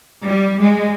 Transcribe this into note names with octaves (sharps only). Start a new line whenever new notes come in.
G3
G#3